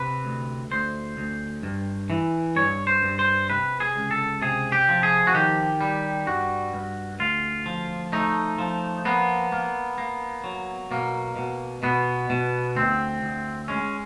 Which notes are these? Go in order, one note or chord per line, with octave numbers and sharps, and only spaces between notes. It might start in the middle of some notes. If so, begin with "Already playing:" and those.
Already playing: C3 B4
D2
D2 C5
D2
G2
E3
G2 C#5
C5
G2
C5
C3 B4
G#4
C#2
A4
C3 G#4
G4
F3
G#4
F#4
D#3 G4
G3
G2 F#4
G2
D2 F4
F3
A3 D#4
F3
A#3 B3
A#3
A#3
F#3
B2 A#3
B2
B2 B3
B2
D2 C4
D2
G#3 C#4